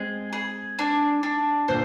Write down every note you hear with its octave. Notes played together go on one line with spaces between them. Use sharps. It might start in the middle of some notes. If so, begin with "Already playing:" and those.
Already playing: G#3 C4 G#4
G#4
D4
D4
A#2 D3 C5